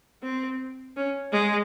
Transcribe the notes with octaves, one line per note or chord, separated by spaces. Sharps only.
C4
C#4
G#3